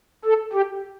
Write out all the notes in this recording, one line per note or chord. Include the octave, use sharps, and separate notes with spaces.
A4
G4